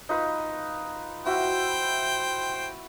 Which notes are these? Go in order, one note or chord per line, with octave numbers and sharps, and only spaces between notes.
D#4 F4 B4
E4 F#4 C5 E5 G5